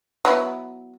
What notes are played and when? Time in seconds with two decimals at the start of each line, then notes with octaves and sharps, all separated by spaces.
0.25 F#3 B3 E4